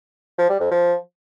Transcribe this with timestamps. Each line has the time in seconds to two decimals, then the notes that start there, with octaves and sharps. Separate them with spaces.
0.38 F3
0.49 G3
0.60 F2
0.71 F3